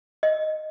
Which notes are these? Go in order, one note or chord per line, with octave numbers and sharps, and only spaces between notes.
D#5